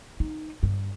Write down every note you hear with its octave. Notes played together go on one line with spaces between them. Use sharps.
D#4
G2